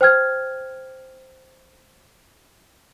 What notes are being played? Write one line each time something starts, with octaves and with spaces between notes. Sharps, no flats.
C5 G5 F6 G#6